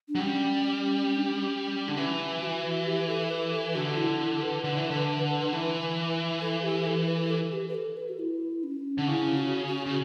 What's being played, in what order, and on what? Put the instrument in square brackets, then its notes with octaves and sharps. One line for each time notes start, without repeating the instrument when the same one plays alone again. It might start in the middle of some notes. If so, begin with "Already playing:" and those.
[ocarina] D4
[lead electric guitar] F#3
[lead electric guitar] G3 [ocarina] C#4
[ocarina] C#4
D4
C#4
[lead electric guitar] D3
E3
[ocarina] F#4
G4
A4
B4
A4
[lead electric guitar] D3 [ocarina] F#4
[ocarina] E4
E4
B4
[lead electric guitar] D3
E3
D3
E3
[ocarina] A4
G4
A4
B4
A4
G4
B4
A4
B4
F#4
E4
C#4
[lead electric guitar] D3
[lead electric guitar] C#3 [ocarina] E4
[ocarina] F#4
F#4
[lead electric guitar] C#3